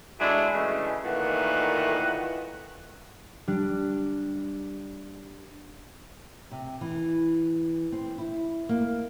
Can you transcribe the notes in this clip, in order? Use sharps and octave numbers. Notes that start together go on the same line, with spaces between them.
F#3 G#3 D4 E4 G#4 A4
C#3 E3 G#3 A3
A#2 D#3 E3 A3 D#5 F#5
G3 D4
C3
E3
C4
E4
A#3